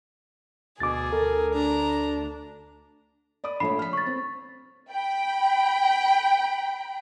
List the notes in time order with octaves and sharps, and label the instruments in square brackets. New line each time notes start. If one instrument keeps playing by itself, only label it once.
[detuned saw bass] D2 [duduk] B2 [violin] G#4 [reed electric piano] D6 A6
[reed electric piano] A4 [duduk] A#4
[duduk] D4 [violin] A#5
[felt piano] D5 B5 D#6
[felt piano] A#1 A3 C#5 [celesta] B5 C7
[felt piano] F6 B6
[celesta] C#6 A6
[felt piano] C4
[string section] G5 B5